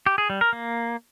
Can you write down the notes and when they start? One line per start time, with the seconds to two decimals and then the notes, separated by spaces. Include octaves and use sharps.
0.06 G4
0.18 G#4
0.30 G3
0.41 A#4
0.53 A#3